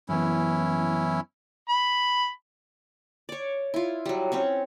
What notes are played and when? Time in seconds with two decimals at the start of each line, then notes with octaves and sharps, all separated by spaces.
0.09 F#2 E3 B3 C#4 E4
1.69 B5
3.29 C#5 D5
3.74 E4 F4
4.06 F#3 G3
4.32 C4 C#4 C#5